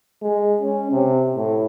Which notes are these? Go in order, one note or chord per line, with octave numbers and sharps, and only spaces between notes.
G#3
C#4
C3
A2